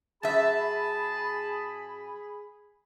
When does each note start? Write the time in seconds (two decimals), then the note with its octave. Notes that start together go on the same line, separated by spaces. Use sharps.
0.23 F#2 G#4 E5 A5 B5